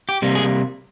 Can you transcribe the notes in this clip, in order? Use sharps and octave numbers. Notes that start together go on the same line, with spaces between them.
G4
C3 G3 A#3
G#4